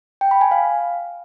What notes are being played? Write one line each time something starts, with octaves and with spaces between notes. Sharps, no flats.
G5
B5
G#5
F5